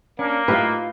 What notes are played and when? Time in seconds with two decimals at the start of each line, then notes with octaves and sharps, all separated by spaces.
0.19 A#3 C#4 D4
0.48 A2 D#4 F4 G4 B4 E5 F5